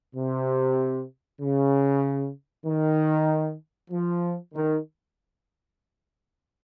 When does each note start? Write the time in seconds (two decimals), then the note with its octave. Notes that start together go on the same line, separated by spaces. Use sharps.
0.15 C3
1.40 C#3
2.65 D#3
3.90 F3
4.54 D#3